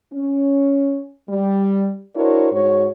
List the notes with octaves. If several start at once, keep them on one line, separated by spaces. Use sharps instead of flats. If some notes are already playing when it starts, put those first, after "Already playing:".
C#4
G3
D4 E4 F#4 A#4 C5 C#5
G#2 F#4 C#5